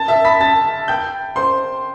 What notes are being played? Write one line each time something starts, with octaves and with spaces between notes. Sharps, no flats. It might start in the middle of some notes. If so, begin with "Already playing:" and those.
Already playing: A5 A6
E5 E6
B5 B6
A5 A6
G5 G6
C5 C6